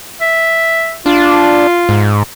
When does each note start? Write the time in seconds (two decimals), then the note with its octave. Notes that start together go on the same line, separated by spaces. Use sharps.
0.21 E5
1.06 D4 F4
1.89 G#2